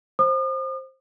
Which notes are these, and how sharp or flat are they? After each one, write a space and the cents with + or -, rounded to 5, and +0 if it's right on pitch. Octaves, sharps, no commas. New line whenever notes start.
C5 +15 D#6 -45